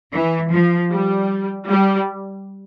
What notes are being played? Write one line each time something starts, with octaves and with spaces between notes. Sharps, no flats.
E3
F3
G3
G3